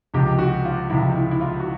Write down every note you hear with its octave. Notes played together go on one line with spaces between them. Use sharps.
C#2 C3 F3 G4
F#4
F4
C#2 C3 F3 E4
E4
E4
F4
F#4